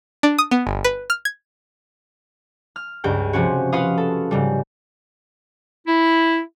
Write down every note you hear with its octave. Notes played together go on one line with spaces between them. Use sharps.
D4
D#6
B3
G1
B4
F6
G#6
F6
C#2 G2 G5
C3 F3 C4 C#4 F#4
F4 F#4 B4 F5 D#6
A4
G#2 C#3 G3
E4